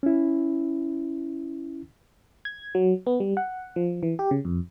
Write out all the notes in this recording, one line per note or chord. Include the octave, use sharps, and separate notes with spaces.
C#4 E4
G#6
F#3
B3
G3
F#5
F3
E3
G4
C#3
F2